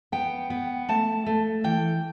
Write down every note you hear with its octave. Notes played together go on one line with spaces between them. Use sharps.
B3 G5
B3
A3 A5
A3
E3 G5